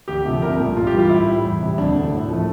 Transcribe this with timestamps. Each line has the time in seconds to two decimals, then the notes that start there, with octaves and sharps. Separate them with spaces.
0.08 D2 G4
0.25 C3 F3 A3
0.42 C2 A#4
0.59 A#2 A3
0.75 G2 F4
0.87 G4
0.93 E3 G3
0.99 F4
1.09 A2 E4
1.28 G3
1.44 E2
1.60 C3 G3
1.78 D2 D4
1.95 D3 A3
2.12 A2
2.28 F3 A3